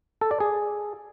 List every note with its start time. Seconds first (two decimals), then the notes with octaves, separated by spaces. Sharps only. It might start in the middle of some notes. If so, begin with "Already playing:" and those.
0.21 A4
0.31 D5
0.40 G#4